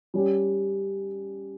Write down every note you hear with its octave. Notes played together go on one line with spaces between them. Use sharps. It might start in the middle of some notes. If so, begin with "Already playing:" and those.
G3 C#4 G4